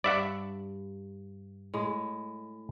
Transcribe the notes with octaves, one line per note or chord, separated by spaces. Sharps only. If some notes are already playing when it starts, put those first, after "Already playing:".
G2 D5 E5 F#5
A2 G#3